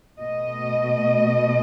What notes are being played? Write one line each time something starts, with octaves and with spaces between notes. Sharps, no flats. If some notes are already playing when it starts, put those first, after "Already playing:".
B2 A3 D#5